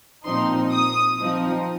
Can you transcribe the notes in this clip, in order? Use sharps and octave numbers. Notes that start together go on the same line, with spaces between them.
A#2 F3 C4 D#4 C6
D#6
F3 C4 D#4